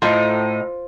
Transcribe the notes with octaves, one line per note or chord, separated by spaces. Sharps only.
A2 D#4 F4 C5